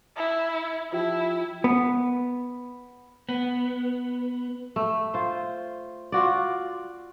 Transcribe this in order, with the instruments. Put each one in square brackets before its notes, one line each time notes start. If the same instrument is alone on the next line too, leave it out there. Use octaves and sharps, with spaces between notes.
[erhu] E4
[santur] F3 G4 [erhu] E4
[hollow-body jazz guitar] B3
[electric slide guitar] B3
[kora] A3
F4 C5
F4 F#4 D5